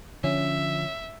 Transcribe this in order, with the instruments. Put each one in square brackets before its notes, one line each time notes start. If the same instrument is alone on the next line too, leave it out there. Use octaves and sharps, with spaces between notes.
[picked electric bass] D3 F3 [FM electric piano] C#4 [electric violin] E5